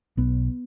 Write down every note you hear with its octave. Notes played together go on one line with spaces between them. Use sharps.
B1 B3